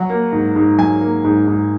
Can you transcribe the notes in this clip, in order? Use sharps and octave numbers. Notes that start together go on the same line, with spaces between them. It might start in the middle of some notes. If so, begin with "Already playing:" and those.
Already playing: F#3 F#5
A#3
G#2
G#2
F#3 G#5
A#3
G#2
G#2